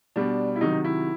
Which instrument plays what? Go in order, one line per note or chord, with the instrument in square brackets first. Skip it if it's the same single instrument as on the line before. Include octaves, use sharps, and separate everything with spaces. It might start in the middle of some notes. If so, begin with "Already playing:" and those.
[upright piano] B2 G3 D4
E4
C3 D#3 F#3 D#4
E4